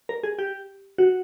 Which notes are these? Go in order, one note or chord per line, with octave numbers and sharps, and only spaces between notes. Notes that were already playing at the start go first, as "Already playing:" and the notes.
A#4
G#4
G4
F#4